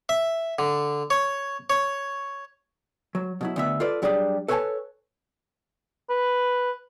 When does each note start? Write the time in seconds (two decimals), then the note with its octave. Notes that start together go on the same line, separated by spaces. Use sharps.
0.09 E5
0.59 D3
1.10 C#5
1.70 C#5
3.15 F#3
3.41 B2 F#3 E4
3.56 D2 B3 E5
3.80 F4 A4 B4 D5
4.02 F#3 G3 D4 G4 G#4
4.48 A4 B4 C#5 E5 G#5 A5
6.10 B4